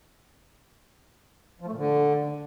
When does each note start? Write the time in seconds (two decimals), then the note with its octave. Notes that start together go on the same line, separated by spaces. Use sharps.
1.61 F3
1.66 A3
1.72 A#2
1.78 D3